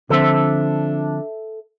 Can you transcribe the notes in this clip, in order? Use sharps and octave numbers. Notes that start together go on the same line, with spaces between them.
D3 F3 C4 D4 A4 E5